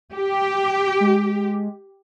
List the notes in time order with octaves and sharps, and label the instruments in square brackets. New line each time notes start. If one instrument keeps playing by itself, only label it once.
[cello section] G4
[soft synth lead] G#3